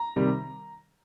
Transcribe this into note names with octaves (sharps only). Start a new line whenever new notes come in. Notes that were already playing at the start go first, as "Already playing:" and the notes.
Already playing: A#5
C3 D#3 G3